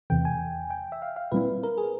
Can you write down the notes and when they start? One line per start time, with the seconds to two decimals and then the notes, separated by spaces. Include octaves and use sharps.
0.10 E2 C3 E3 A3 G5
0.25 G#5
0.70 G5
0.92 E5
1.02 F5
1.16 F5
1.32 A#2 G3 C4 E4 B4
1.63 A#4
1.78 G#4